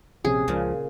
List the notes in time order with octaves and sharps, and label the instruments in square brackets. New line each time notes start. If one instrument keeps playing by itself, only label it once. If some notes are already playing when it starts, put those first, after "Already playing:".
[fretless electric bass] A#1 C3 C#4 [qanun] G#4
[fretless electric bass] C#2 F3 [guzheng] A#2 C#3